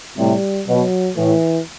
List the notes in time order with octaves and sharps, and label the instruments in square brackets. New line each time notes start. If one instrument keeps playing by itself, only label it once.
[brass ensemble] A2 C3 [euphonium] G3
[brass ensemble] B2 [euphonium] F#3
[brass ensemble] A2 [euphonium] E3